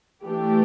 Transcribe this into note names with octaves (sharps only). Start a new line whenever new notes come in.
E3 A3 D4 G4